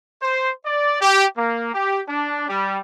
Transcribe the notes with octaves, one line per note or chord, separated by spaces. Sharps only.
C5
D5
G4
A#3
G4
D4
G3